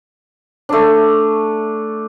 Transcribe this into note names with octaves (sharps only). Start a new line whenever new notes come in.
A3 D4